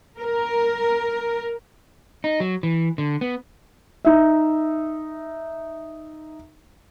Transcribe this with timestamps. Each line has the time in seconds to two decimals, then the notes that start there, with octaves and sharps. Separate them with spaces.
0.20 A#4
2.24 D#4
2.40 F#3
2.63 E3
2.98 D3
3.21 B3
4.05 D#4 E5